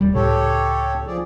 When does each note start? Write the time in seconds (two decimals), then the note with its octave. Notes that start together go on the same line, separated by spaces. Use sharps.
0.01 D#1 G3
0.15 C#2 A2 C#3 G4 A4 C#5
1.07 F3 G#4 D5